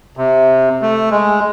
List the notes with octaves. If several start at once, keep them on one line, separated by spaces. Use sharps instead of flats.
C3
A3
G#3